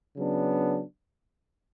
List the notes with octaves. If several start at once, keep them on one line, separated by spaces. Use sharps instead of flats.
C#3 F#3 B3 D4